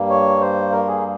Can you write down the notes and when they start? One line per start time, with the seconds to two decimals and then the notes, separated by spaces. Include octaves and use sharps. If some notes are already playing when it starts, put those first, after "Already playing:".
Already playing: G2 G3 A#3
0.10 C#5
0.41 C5
0.72 A#4
0.88 G#4